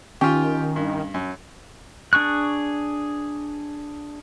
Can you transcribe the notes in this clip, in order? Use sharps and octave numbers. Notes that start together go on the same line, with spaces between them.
D#3 C#4 F4 G4
G2
F#2
D4 G#4 C#6 F#6